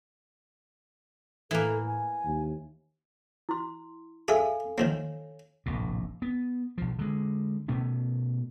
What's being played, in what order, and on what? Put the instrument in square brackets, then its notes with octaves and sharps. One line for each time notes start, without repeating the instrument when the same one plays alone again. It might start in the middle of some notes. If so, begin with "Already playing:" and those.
[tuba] A2 [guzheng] E3 A#3 [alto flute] A4
[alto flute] G#5
[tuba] D#2
[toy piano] E4 C6
[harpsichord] G#4 E5 [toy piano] A4 F5 G#5
[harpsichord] D#3 F3 A#3 [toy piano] C#5
[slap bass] F1 A#1 A2
B3
B1 F3
D3 G#3
B2 A3 B3 C#4